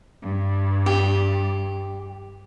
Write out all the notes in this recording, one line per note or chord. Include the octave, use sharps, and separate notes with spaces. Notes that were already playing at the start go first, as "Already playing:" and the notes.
G2
G4